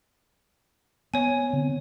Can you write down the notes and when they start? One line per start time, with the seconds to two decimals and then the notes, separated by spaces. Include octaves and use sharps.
1.14 B3 C#5 G#5
1.53 D3 B3 C4